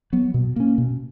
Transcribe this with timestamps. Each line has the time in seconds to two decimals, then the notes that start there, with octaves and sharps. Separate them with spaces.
0.13 F#3 B3
0.34 B2
0.56 A#3 C#4
0.78 B2